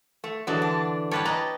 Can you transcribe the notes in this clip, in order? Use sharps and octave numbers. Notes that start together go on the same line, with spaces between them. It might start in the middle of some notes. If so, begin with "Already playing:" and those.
A3
D3 E3 F#3 G#3 A5
D4
G3 G4 B4 C#5 A5
B4 D#5 A#5